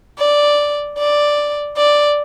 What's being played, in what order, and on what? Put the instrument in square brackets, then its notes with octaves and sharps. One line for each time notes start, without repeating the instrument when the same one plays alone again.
[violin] D5
D5
D5